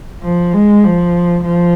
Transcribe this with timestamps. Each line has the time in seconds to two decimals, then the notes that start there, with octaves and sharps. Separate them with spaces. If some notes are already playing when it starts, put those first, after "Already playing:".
0.22 F3
0.53 G#3
0.84 F3
1.44 F3